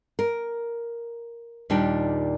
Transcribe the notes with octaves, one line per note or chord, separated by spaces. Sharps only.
A#4
D#2 A#2 G3 D4 D#4 G4